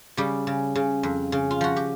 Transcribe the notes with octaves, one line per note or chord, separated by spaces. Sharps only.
C#3 G3 G4
C#3
C#3
F2
C#3
F4
F3 F#4
G4